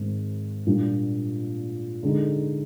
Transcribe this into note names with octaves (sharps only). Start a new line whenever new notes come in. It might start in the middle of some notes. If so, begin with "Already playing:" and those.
Already playing: G#2 D#3 G#3 C4
A#2 G3 D4
D3 G#3 D#4